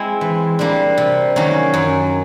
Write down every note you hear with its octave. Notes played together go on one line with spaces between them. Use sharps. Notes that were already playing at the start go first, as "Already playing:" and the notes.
Already playing: G#3 C4 E4
E3
G3 A#3 D4
C3
D#3 F#3 A#3 C#4
F#2